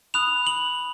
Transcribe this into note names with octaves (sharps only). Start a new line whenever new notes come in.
B5 D#6 F#6 F7
F#7